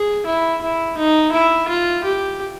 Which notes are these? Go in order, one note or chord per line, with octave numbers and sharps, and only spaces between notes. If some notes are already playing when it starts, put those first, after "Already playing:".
Already playing: G#4
E4
E4
D#4
E4
F4
G4